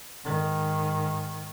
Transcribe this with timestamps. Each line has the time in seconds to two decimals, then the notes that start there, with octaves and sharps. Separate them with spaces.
0.25 G#2 D#3